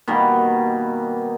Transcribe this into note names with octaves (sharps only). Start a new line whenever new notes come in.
B2 D#3 G3 A#3